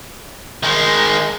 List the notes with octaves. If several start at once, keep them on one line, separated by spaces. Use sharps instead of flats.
D#3 G#3